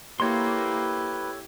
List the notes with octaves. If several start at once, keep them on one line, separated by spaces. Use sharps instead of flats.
A#3 E4 G4 A4 B4 C#5 C6